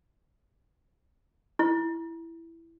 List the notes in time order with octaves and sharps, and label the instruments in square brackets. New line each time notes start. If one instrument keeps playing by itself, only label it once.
[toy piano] E4